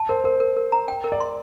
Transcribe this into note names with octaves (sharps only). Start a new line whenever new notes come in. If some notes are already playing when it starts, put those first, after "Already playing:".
Already playing: A5
A#4 C5
A#4 C5
A#4
A#4
A#5
G5
A#4
D5
C6